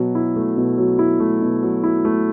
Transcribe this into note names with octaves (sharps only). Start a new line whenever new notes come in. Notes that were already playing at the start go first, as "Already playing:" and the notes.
Already playing: B2 F#3
E4
A3
B2
F#3
E4
A3
B2
F#3
E4
A3